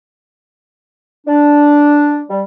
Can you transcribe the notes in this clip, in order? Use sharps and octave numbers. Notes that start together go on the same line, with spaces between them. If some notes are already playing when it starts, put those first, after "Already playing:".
D4
G3